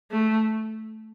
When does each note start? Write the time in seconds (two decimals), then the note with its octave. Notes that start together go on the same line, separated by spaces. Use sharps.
0.11 A3